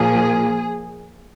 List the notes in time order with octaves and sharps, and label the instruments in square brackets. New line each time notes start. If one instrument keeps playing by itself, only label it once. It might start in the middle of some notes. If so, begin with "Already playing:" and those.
Already playing: [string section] A#2 F3 A#3 G#4